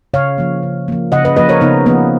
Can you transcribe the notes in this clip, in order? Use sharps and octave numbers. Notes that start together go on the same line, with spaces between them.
C#3 C#5 F5
F3 A#3
C#3
F3 A#3
C#3 D#5 F#5
B4 D#5
F3 A#3 B4 D#5
A#4 C#5
C#3 B3 D#4
F3 A#3 B3